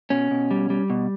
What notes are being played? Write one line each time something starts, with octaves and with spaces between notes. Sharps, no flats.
B2 C#4
B2
G3
G3
B2